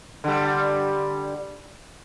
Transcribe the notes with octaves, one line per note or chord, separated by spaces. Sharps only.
D3 G3